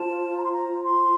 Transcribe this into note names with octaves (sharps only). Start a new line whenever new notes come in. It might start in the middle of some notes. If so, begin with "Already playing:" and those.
Already playing: F4 C5 A5
A#5
C6
A#5
C6